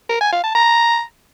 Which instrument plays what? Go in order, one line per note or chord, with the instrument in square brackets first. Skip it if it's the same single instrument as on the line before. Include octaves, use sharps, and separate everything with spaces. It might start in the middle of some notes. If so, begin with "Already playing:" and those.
[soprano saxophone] A#4
G#5
F5
A5
A#5